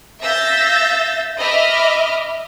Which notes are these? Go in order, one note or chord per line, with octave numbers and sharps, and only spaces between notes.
E5 F5 E6 G6 A6 A#6
D#5 E5 B5 D6 F6